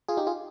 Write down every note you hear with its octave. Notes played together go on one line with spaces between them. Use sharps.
F4 G#4
D#4 G4
F4 G#4